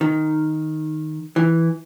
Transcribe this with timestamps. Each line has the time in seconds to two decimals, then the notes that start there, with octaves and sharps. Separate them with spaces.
0.01 D#3
1.36 E3